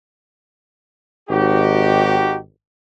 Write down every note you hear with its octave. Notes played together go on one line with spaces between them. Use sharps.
G#1 D#4 F#4 G4